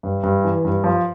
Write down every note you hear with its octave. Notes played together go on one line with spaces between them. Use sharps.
G2
G2
E3
G2
F3